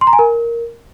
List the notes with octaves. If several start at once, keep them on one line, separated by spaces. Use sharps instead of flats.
C6
A#5
G#5
A#4